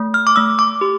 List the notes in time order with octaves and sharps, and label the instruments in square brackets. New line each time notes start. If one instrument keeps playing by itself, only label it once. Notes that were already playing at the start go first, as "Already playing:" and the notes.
Already playing: [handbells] A3
F6
D6
A3 E6
D6
G4